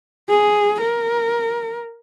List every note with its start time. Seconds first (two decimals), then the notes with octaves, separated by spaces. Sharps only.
0.29 G#4
0.81 A#4